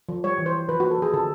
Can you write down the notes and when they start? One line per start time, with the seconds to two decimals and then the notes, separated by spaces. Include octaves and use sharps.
0.09 F3
0.24 G3 C#5
0.38 E3
0.46 C5
0.53 G3
0.69 F3 B4
0.80 A#3 F#4
0.91 A4
0.98 F3 G#4
1.13 D3 A4